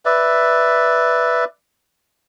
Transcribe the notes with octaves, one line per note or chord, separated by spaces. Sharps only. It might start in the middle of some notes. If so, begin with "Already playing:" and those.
B4 D5 E5